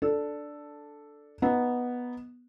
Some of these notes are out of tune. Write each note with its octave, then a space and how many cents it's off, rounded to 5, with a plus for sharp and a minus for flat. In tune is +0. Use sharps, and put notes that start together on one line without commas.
D4 +0 A4 +0
B3 -5 D#4 +0